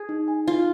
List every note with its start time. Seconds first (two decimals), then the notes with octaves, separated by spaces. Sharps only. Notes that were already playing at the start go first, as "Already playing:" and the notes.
Already playing: G#4
0.09 D#4
0.28 G#5
0.47 D#4 F4